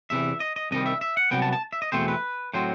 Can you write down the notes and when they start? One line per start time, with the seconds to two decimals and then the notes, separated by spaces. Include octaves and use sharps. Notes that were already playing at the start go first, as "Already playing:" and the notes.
0.10 E2 C3 E3 E5
0.40 D#5
0.56 D#5
0.71 C2 C3 D#3 G3 D#5
0.86 E5
1.01 E5
1.17 F#5
1.31 C2 C3 F#3 B3 G5
1.42 A5
1.53 A5
1.73 E5
1.82 D#5
1.92 E2 B2 A3 C4 C5
2.08 B4
2.54 A2 F#3 C4 C5